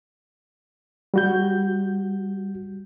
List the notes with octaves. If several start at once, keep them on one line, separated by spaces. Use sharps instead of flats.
G3 F#4 G6